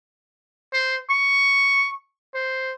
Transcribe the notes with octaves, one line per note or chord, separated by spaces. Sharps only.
C5
C#6
C5